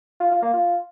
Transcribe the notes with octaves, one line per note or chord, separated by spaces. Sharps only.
F4
F4
A#3
F4